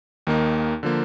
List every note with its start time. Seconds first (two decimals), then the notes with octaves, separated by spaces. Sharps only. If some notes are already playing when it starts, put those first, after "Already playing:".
0.27 D#2 D#3 A#3 D#4
0.83 D3 F3 A#3